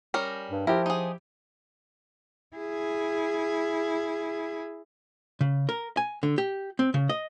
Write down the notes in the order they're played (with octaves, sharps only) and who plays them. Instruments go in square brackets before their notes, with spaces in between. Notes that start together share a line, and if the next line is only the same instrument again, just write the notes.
[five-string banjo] G3 C#4 A#4
[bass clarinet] G2
[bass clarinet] F3 [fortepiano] E4 G4 [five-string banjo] A#4
[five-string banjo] D#4 G#4
[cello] E4 G#4
[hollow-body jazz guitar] C#3
A#4
G#5
D3
G4
C4
C#3
D#5